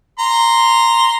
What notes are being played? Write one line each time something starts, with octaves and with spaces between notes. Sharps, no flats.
A#5 C6